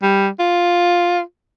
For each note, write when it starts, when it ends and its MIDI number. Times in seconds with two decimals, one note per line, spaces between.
0.02 0.28 55
0.40 1.20 65